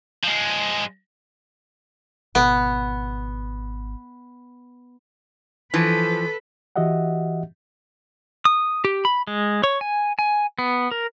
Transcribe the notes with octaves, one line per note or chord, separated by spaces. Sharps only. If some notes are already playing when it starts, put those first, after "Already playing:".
F3 G#3
G#1 B2 B3
E3 F3 A4 B4
E3 F#4 G4 D#5 E5 F#5
D#6
G4
B5
G#3
C#5
G#5
G#5
B3
A#4